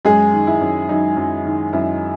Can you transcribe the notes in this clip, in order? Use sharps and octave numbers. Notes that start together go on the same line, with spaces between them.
F#2 G#3 G#4
D#3
E4
F#2
F#3 D#4
F#2
D#3
F#2 E4